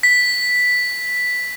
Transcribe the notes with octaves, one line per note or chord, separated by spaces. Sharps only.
B6